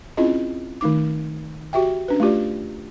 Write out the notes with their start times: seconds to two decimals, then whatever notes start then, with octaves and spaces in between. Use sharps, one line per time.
0.17 C4 C#4 E4 F4 G#4 D#5
0.81 D#3 A3 D#4 D6
1.73 F#4 G4 E5 G5
2.08 C#4 D4 B4
2.20 A3 F4 G4 D5